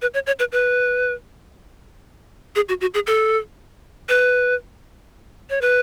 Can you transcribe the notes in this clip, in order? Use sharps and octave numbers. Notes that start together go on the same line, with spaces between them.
B4
C#5
C#5
B4
B4
G#4
F#4
F#4
G#4
A4
B4
C#5
B4